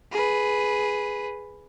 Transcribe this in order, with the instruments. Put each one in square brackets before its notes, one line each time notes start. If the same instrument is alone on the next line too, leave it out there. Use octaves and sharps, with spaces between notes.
[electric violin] G#4 B4